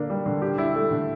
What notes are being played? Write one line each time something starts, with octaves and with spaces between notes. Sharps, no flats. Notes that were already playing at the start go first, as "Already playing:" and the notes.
Already playing: D3 A#3 D4
G3
D3
G4
E4
A3
D3